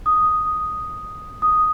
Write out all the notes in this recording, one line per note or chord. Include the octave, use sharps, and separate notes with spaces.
D#6
D#6